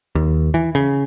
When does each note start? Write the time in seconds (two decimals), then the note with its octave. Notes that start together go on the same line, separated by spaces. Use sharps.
0.15 D#2
0.54 E3
0.75 C#3